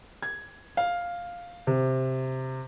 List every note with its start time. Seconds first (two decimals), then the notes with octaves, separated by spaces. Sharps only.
0.22 G#6
0.77 F5
1.67 C3